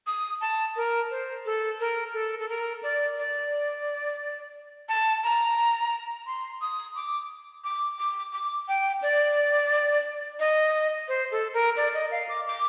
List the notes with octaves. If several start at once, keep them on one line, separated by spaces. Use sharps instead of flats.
D#6
A5
A#4
C5
A4
A#4
A4
A4
A#4
D5
D5
A5
A#5
C6
D#6
D6
D6
D6
D6
G5
D5
D#5
C5
A4
A#4
D5
D#5
F5
D6
D6